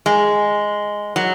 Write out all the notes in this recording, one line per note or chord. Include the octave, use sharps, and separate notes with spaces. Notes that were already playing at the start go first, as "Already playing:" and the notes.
G#3
F#3